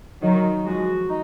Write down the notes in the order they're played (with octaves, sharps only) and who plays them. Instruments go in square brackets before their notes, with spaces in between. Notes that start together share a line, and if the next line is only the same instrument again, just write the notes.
[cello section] D#3 F#3 [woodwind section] D#4
[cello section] F3 G#3 [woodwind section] F#4
[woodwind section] D#4